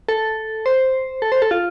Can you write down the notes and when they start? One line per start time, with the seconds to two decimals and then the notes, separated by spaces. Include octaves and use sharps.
0.09 A4
0.66 C5
1.22 A4
1.32 C5
1.42 A4
1.51 F4